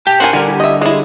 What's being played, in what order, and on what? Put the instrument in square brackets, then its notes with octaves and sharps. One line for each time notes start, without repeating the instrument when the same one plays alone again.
[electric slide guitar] A#2 G5 A5 [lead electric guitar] G4
[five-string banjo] C#4 A#4 G#5 [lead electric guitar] C5 F#5
[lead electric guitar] D3 G3 [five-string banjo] A#4 G#5
[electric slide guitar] E4 G4
[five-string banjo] D#5 E5
[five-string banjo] G#3 E4 [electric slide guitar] G#4 C#5